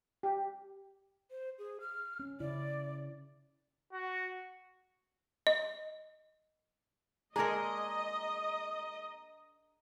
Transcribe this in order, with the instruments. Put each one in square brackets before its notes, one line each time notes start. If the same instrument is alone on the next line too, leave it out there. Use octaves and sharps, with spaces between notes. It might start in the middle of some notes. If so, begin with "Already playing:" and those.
[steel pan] G4
[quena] C5
G#4
F6
[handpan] C#4
[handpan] C#3 E4 [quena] D5
[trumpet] F#4
[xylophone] D#5
[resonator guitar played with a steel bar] G#3 A#3 G#4 [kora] D4 A#4 [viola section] D#5 [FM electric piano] A#5